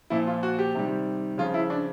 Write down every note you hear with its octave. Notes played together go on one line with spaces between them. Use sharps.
A#2 F3 E4
F4
F#4
G4
C3 D#3 G3
C#3 F3 F4
E4
D4